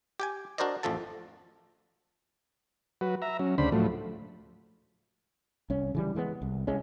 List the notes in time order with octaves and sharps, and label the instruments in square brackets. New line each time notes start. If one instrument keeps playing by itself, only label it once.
[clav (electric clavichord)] G4 G5 G#5
D4 F#4 A#4 C5 D5 D#5
A1 F2 F3 A4 A5
[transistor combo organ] F#3 F#4 B4
E5 A#5
F#3 C#4
D2 C#3 D4 C5 B5
A2 F3 F#3 A3
[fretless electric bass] C2 C#4
C#3 E3 G3
E3 G#3 A3 B3
C2
C2 G#3 C#4